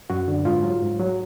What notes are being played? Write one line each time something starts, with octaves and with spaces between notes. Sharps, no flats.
F#2 F#4
D3
G#2 F4
F#3
G#2
F#3